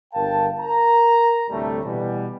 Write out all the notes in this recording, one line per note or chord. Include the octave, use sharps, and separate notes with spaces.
G1 A#4 F5 G5 A5
A#4 A#5
D2 A2 C3 G3 A3
B2 E3 G3